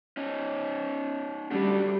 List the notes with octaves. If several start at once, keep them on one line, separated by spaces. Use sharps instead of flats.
C#4 D#4
G3 A3 D4 F#4